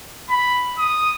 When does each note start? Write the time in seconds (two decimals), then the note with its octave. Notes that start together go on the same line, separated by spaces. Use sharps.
0.30 B5
0.78 D#6